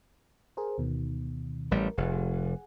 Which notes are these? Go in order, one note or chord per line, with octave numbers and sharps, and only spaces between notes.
G#4 A#4 C5
D2 B2 D#3
A1 G3 A#4
F1 G#4 F#5 G#5